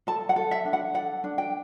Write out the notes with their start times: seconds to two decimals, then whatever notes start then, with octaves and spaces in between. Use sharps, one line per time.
0.07 A4 A5
0.29 F#5
0.36 A4
0.51 E5
0.65 D4
0.73 F#5
0.94 A4 F#5
1.24 D4
1.38 G5